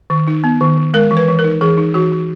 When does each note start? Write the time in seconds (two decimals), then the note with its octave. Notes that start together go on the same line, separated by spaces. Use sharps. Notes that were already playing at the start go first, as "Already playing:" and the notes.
0.10 D#3
0.28 D#4
0.44 B3
0.61 D#3
0.77 D#3
0.94 G#3 A#4
1.11 E3
1.17 B4
1.28 E3
1.39 A#4
1.44 D#4
1.61 E3 G#4
1.77 D#4
1.94 E3 F#4
2.12 E3